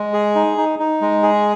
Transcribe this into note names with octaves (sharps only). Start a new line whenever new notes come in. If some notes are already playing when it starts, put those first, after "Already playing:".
Already playing: G#3
G#4
D#4
D#4
D#4
G#3
G#4